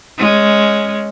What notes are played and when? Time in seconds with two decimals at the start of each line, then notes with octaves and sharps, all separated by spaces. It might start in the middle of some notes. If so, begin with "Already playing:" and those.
0.18 G#3 C#4